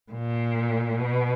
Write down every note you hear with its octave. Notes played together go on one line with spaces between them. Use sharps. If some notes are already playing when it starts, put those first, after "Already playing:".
A#2
B2